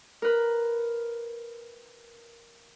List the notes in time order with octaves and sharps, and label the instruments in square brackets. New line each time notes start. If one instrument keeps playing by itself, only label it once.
[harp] A#4 B4